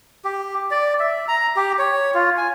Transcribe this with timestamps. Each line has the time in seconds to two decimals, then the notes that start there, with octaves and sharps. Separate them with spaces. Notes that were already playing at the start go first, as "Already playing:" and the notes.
0.25 G4
0.71 D5
0.99 E5
1.28 A#5
1.56 G4
1.79 C#5
2.14 F4
2.38 G#5